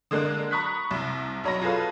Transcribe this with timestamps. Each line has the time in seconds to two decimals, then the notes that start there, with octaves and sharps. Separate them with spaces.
0.11 D3 G#3 A#3 D4 F#6
0.51 A#5 B5 C#6 D#6 F#6 B6
0.91 C2 C3
1.44 B1 F#3 C#5 A#5 B5 A#6
1.61 F4 G#4 A4 B4 F5